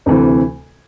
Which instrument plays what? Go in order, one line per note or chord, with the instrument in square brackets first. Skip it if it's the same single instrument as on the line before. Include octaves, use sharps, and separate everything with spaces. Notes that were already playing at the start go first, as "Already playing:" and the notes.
[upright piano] D2 C3 E3 A3